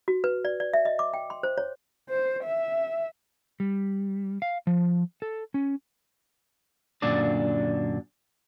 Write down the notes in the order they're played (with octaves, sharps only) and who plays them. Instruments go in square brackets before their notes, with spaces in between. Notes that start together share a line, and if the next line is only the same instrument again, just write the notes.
[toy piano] F#4
B4
D5
D5
E5
D#5
D6
G5
C6
C5
C#5
[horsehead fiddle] C5
E5
[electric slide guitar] G3
F5
F3
A4
C#4
[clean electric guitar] F#2 A#2 D3 D4 D5